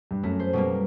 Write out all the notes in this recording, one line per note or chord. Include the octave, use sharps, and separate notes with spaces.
G2
F#2 A3
C5
B2 G3 A#3